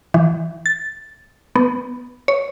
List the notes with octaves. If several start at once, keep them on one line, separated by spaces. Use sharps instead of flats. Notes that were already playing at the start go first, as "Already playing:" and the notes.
E3
A6
B3
C#5